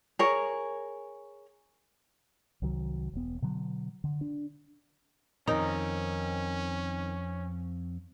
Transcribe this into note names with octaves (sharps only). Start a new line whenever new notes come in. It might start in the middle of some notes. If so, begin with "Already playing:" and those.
G#4 A#4 C#5
C2 D#3 F#3
E1 B3
B2 D3 F#3
D3
D4
F2 D#3 C4 C#4 D#4 A#5